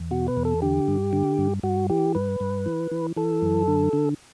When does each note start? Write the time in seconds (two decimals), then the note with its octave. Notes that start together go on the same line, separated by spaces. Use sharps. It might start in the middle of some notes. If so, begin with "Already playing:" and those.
Already playing: E2
0.11 B2 F#4
0.28 B4
0.37 E2
0.45 A4
0.62 D3 G4
0.88 G2
1.13 D3
1.38 G2
1.63 G2 F#4
1.89 E3 G4
2.15 G2 B4
2.40 G2
2.66 E3
2.91 E3
3.16 E3 A4
3.42 F#2
3.68 D3
3.93 D3